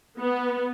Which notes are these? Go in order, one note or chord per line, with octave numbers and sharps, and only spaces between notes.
B3